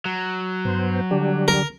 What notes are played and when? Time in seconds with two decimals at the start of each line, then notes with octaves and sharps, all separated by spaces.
0.05 F#3
0.65 G2 B3 C5
1.11 D3 G3 D4 G4
1.48 A#4